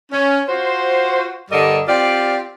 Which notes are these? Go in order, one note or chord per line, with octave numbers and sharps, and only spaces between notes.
C#4
F4 F#4 C5
G2 D3 G3 A#4 D#5
C4 F4 G4 D5